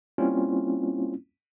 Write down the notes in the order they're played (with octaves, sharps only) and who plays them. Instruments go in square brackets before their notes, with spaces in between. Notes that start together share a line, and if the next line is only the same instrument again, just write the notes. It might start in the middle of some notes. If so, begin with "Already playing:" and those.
[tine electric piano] G3 A#3 C4 C#4 E4 F4